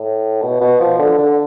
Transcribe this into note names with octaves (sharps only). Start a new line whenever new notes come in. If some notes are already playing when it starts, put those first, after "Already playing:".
Already playing: A2
B2
B2
F3
D3
D3